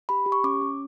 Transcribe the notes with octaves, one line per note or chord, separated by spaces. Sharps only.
G4 B5
G4
C#6
C#4 D6
C#4